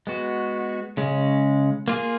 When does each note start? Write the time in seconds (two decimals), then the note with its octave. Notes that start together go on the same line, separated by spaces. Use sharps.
0.07 G#3 B3 F#4
0.97 C#3 G#3 C#4
1.88 A#3 F4 G#4